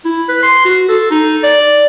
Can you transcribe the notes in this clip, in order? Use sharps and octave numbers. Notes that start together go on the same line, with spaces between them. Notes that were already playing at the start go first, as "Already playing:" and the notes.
E4
B4
C6
F#4
A4
D#4
D5